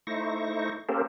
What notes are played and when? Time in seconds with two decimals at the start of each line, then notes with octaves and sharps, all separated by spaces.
0.07 A3 D#4 E4 C5 C#6 A#6
0.89 A#3 C#4 G4 A4 A#4 C5